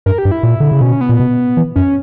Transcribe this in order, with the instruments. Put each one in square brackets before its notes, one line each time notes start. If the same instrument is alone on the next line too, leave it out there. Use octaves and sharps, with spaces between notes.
[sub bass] G2 [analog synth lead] A#4
[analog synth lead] G4
[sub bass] G2
[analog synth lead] E4
[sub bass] A#2
D3
C#3
[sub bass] B2 [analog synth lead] C#4
[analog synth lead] B3
[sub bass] A#2
B2
E3
[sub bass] F#2 [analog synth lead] C#4